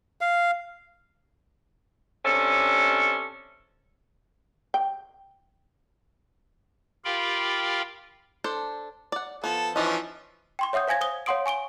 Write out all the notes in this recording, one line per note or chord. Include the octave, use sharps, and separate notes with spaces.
F5
C3 C#4 D4 A4
G5
F4 G4 A#4 F5 G5 B5
D4 A4 C5
D5 F#5
F3 B3 A4
E3 F3 C#4 D#4 D5 D#5
G5 C6 C#6
C#5 E5 F#5 D#6 G6
C5 F5 G#5 G#6 A#6
C5 D#6 G7
C#5 F5 F#5 C6 D#6 D7
G#5 C#6 D7 G7